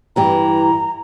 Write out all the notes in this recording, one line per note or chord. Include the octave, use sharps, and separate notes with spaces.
G2 E3 G4 A#5